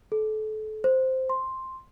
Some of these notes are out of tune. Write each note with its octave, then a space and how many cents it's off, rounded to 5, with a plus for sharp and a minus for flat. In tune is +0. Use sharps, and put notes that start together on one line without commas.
A4 -30
C5 -5
C6 +5